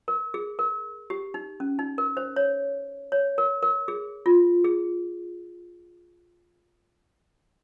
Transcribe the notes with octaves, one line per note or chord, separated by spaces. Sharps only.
A#4
G#4
A#4
G4
D#4
C#4
D#4
A#4
C5
C#5
C#5
A#4
A#4
G#4
F4
G#4